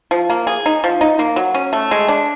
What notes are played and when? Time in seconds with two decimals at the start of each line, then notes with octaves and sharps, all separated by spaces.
0.11 F3
0.30 A#3
0.47 G#4
0.66 D#4
0.84 F3
1.01 D#4
1.19 A#3
1.36 F#3
1.54 C#4
1.73 A3
1.91 G#3
2.08 D4